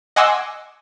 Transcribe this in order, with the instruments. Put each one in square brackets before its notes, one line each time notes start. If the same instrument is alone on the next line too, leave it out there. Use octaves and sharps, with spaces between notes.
[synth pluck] D#5 F#5 G#5 C6 D6 E6